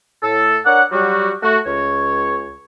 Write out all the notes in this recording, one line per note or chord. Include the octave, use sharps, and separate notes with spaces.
A2 A4
D4 A#4 C#5 D5 F#5
F#3 G3 F#4
A3 F#4
C#2 C#5